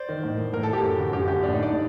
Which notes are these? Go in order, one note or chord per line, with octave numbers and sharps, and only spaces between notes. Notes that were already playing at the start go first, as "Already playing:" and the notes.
Already playing: C5 D5
D#3
A2
A2 A#4
A4
G4
F#2
D3
F#2 G4
D3 G4
A2 D4
D#4
D5
A2